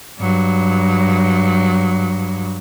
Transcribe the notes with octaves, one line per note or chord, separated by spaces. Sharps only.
G2 F#3